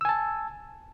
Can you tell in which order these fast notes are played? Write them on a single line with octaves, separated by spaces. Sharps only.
E6 G#5 A5